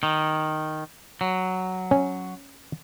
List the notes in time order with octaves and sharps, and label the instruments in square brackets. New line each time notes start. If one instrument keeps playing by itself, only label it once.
[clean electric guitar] D#3
F#3
[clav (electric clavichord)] C#4